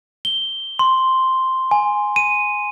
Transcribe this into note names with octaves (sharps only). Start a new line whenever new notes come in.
G7
C6
G#5
D#7